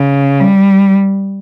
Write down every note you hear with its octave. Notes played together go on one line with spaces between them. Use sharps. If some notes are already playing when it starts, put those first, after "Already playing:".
Already playing: C#3
G3